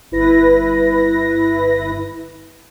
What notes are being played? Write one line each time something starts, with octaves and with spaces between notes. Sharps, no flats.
G1 E4 B4 A#6